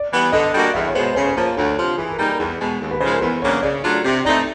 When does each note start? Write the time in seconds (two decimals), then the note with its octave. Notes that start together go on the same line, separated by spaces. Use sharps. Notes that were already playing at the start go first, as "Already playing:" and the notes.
Already playing: D5
0.12 E3 G3 B3
0.32 D3 D#5
0.54 G3 A#3 D4 F#4
0.74 E2 E5
0.88 C#5
0.95 B2 G#3 B3 C5
1.15 C#3 C5
1.29 C5
1.35 F3 A#3 C#5
1.57 D2 C#5
1.77 C3 F3
1.97 E3 G#4
2.10 A#4
2.18 G3 A#3 D#4 A4
2.39 E2
2.60 B2 G#3
2.80 D#2
2.91 B4
3.01 C#3 F3 G#3 C5
3.11 A#4
3.21 E2 B4
3.42 C#3 F#3 A#3 D4 C#5
3.62 C#3 D5
3.83 F#3 A3 D4 F4
4.04 C3
4.25 E3 A3 C4 D#4 D5